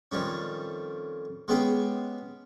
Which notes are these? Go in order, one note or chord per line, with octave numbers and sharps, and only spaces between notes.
F2 D#3 G3 C#4
G#3 B3 C#4 G4 G#4